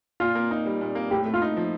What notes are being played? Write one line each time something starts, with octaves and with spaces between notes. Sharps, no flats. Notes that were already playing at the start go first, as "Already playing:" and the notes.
A#2 F4
A#3
D#4
G3
A#2
A#3
A2 G4
A3
F4
D#4
F3